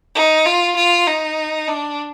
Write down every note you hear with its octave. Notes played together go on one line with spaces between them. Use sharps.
D#4
F4
F4
D#4
D4